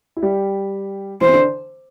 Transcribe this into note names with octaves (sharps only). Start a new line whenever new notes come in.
E4
G3 G4
E3 E4 C5
C4
D3 D4